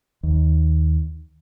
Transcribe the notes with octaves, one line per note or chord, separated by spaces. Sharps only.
D#2